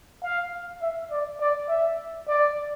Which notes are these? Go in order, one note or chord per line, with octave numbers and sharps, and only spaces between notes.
F5
E5
D5
D5
E5
D5